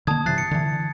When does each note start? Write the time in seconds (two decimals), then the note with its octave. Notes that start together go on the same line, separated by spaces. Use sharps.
0.07 D3 D#3 A#3 A5 D#6 G#6
0.26 G2 C3 E3 F#6 A6 C7
0.38 C#7
0.51 D3 E3